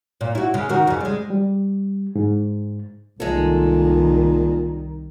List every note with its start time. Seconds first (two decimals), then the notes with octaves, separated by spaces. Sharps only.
0.21 A#2
0.35 E4 F#4
0.54 C#3 G#3
0.69 D#3 F#4
0.87 F2 C#3
1.01 G3 G#3
1.30 G3
2.16 G#2
3.20 C2 A#2 D#3 G#3 A4